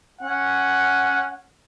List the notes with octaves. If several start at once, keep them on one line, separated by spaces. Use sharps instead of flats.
C#4 F#5